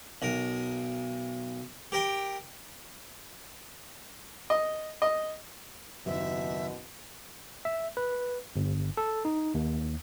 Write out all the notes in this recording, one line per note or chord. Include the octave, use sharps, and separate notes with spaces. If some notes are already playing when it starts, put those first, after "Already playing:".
B1 A#4
G4 A#4 G5
D#5
D#5
F#1 D#2 B2 E5
E5
B4
G1
A4
D#4
D#2